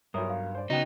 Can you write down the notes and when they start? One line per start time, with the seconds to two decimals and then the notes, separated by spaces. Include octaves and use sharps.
0.14 B1 G2 A#4 C#5 E5 D#6
0.30 F5
0.55 C5 D5
0.70 C#3 B3 D#4 F#4 G5